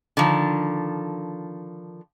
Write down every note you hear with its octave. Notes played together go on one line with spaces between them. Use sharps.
D3 D#3 F3